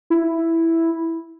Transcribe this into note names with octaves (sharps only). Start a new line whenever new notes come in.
E4